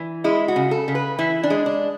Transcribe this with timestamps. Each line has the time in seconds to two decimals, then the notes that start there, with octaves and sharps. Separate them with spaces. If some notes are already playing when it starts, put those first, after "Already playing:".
Already playing: E3
0.24 G#3 E4
0.48 F#4
0.56 C#3
0.71 A4
0.88 C#3
0.95 B4
1.18 E3 E4
1.43 D4
1.50 G#3
1.66 D4